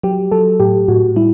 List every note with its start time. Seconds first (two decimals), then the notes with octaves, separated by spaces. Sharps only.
0.03 F#3 G4
0.31 F#3 A4
0.60 A2 G4
0.88 A2 F#4
1.16 G3 E4